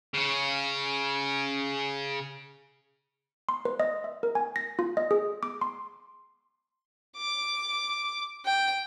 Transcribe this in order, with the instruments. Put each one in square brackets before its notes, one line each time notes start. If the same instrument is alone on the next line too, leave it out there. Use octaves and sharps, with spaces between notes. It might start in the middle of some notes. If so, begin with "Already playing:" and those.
[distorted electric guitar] C#3 C#4
[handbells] C6
B4
D#5
E5
A#4
G#5
A#6
F4
D#5
G#4
D6
C6
[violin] D6
G5